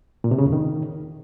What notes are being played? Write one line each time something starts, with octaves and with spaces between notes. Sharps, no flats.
A#2
C3
C#3
E2
D#3